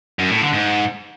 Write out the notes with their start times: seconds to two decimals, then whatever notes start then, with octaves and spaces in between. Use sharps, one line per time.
0.19 F#2
0.30 A2
0.42 D3
0.53 G#2